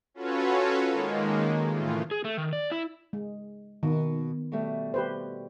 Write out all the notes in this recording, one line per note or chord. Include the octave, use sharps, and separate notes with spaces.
C#4 F4 F#4 A4 B4 C#5
D#3 G#3 A#3
A2 C#3 E3 A3 F4
G#4
A3
D#3
D5
E4
G#3
B2 D#3
B2 G3 A3
G4 B4 C5